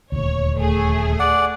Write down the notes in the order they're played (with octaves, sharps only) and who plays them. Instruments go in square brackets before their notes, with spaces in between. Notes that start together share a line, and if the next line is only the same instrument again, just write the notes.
[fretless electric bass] D#1 D2 [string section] C#5
[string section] A3 G#4
[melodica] D5 F#5